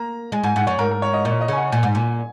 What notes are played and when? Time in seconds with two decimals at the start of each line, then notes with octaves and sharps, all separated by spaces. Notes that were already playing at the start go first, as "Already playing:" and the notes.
Already playing: A#3 A#5
0.32 G#3 G#5
0.43 G#2 G#5
0.56 G#2 F#5
0.67 F#2 C#5
0.79 G#2 A#4
0.91 A#4
1.02 C#5
1.13 D#5
1.25 A#2 C#5
1.41 D#5
1.48 C#3 G#5
1.57 F#5
1.72 A#2 G#5
1.83 G#2
1.95 A#2 G#5